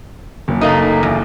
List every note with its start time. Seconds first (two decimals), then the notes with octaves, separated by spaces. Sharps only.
0.48 F#1
0.61 A3 A#3 D#4
1.03 E2